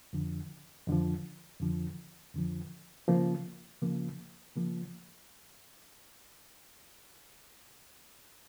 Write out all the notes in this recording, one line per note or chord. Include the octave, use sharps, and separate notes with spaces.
F2 D3 F3
F2 D3 F3
F2 D3 F3
F2 D3 F3
C#3 F3 A#3
C#3 F3 A#3
C#3 F3 A#3